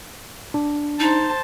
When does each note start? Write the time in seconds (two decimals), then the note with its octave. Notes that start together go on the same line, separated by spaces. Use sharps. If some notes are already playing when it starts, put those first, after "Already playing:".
0.54 D4
1.00 D#4 C5 A5